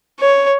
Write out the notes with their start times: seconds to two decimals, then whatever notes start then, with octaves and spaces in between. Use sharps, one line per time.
0.20 C#5